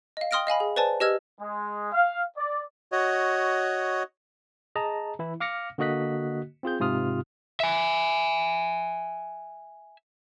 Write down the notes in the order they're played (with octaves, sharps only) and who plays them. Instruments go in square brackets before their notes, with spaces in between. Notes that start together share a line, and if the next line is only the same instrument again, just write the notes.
[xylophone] D#5 F5
G5 C6 D#6 F6 A#6 D7
D#5 F5 G#5 B5
G#4
B4 C5 D5 G#5 A5
G4 B4 D#5 E6 F6 G#6
[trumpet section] G#3
F5
D5
[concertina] F#4 C#5 D#5
[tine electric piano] G#4 D#5 A5 A#5
E3 E4
F5 D6 F6 A#6 C#7
D3 A#3 F#4 D#5 F#6 B6
C4 F4 G#4 G6
G#2 C3 F4 D#6 F6
[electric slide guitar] E5 G#5